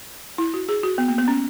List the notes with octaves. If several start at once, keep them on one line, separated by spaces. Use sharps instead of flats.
E4
F#4
G#4
F#4
B3
A#3
B3
C#4